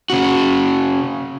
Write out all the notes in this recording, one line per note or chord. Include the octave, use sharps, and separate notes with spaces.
C#3 F#4